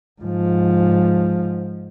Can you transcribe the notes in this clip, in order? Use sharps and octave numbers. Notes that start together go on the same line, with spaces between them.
G#2 F3